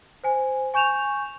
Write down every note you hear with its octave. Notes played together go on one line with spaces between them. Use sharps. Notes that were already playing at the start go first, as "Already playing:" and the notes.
C5 G#5
G#5 C#6 G6 E7 F7